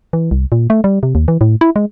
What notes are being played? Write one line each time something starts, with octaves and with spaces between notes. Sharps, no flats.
E3
C2
A#2
A3
G3
C3
D#2
E3
A2
E4
G#3